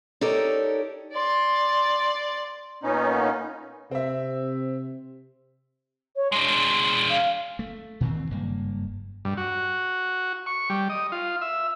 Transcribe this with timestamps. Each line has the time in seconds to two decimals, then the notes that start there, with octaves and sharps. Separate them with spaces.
0.21 D#4 G4 A4 A#4 C#5 D5
1.12 D5 C6
2.83 A#2 B3 C#4 D#4
3.91 C3 C4 E5
6.16 C#5
6.32 G#3 D4 C6
7.10 F5
7.59 A3
8.01 A#2 D#3 E3 C4
8.31 F#1 G2 A#3
9.25 G2
9.37 F#4
10.46 C#6
10.70 G3
10.90 D#5
11.12 F4
11.42 E5